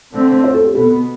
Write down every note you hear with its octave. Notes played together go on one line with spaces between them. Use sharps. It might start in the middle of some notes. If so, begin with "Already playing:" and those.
D3 A3 C4
C5
A4
G4
B2 B3 A4